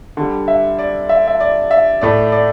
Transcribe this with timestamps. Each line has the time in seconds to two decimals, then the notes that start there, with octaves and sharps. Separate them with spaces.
0.17 D3 G3
0.48 E5
0.78 D5
1.09 E5
1.28 E5
1.40 D5
1.71 E5
2.01 A2 A3 D5
2.32 D5